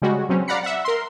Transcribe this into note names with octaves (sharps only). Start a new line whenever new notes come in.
C#3 G3 G#3 F#4
B2 F#3 C4 C#4
D5 F5 F#5 A#5 B5 C#7
E5 F#5
A#4 C6